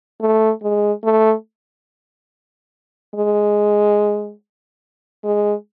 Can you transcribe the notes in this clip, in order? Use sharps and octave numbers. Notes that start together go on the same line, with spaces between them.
A3
G#3
A3
G#3
G#3